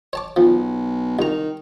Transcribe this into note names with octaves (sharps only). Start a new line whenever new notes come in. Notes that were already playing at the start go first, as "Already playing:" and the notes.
C#5 A5 D6
B1 F3
C2 D#3 A#5